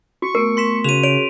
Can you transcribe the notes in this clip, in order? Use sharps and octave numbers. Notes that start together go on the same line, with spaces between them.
F#4 C#6
A3 B3 A#4
C6 B6 E7
C#3 C#4 F#4 G#4 D#7 F7
C#5 D7 F7